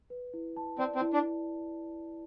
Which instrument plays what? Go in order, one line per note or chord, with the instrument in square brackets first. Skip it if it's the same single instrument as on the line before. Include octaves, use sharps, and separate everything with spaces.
[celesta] B4
E4
A5
[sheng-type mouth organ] C4 [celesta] D5
[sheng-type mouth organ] C4
[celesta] E4
[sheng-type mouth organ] D4